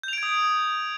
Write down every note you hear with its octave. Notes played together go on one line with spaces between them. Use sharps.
D#6 G6 G#6 D7 F7